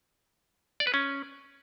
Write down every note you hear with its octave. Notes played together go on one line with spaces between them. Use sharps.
D5
B4
C#4